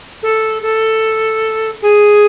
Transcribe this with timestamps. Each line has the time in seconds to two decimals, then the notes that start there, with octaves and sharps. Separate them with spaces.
0.23 A4
0.62 A4
1.82 G#4